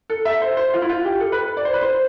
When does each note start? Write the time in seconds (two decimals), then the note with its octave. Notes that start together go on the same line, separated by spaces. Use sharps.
0.10 A4
0.25 E5
0.42 C5
0.57 C5
0.73 F4
0.82 E4
0.89 F4
1.05 G4
1.20 A4
1.32 B4
1.44 B4
1.57 D5
1.65 C5
1.73 B4
1.82 C5